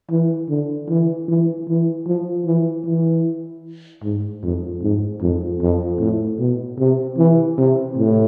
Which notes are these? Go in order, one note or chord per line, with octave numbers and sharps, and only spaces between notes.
E3
D3
E3
E3
E3
F3
E3
E3
G#2
F2
G#2
F2
F2
A2
B2
C3
E3
C3
A2